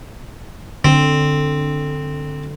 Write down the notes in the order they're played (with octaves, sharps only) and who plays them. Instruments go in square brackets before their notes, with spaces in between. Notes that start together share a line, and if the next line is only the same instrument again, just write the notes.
[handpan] D3 [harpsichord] C4